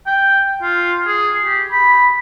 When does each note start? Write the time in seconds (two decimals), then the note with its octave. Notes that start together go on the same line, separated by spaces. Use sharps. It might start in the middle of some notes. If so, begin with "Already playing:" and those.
0.07 G5
0.62 F4
1.07 G#4
1.45 G4
1.72 B5